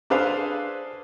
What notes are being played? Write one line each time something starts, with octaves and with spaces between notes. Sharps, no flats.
D4 G#4 A4 B4 C5 F5